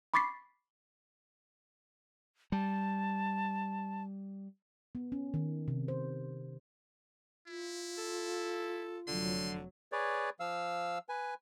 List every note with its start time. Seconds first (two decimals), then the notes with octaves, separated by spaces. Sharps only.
0.14 B5 C#6 D6 A6 B6 C7
2.52 G3 A5
4.95 B3
5.12 C#4
5.34 D#3
5.68 C3
5.88 C5
7.47 E4 F4
7.98 A4
9.08 F1 D3 F#3 C6
9.92 G#4 B4 C#5 D5
10.40 F3 F5 E6
11.09 B4 G#5